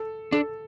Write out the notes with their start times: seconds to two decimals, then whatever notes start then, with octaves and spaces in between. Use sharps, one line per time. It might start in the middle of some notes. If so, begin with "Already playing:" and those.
Already playing: A4
0.32 D4 A4